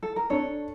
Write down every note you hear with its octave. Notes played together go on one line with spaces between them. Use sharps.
A4
A#4
D4 A4 C#5